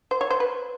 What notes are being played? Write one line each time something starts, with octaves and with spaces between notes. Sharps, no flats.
C5
C#5
C5
B4